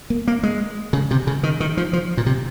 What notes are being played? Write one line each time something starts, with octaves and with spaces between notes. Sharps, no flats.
A#3
A#3
G#3
C#3
C3
C#3
D#3
D#3
F3
F3
A#2
C3